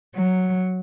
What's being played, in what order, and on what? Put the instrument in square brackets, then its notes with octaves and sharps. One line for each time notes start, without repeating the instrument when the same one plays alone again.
[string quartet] F#3